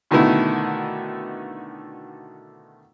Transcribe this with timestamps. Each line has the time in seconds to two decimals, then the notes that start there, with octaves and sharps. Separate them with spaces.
0.11 B2 D3 D#3 A3 B3 E4